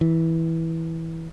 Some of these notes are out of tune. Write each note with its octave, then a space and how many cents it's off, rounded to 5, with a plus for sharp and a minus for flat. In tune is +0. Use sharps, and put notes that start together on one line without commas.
E3 -10